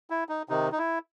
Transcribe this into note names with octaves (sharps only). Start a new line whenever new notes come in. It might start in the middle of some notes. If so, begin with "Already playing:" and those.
E4
D#4
C3 D#3 D#4
D#4
E4